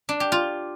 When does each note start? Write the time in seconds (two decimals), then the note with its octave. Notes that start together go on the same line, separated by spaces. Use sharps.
0.09 D4
0.20 G4
0.32 F4